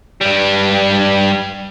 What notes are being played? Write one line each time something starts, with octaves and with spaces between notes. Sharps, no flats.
G2 G3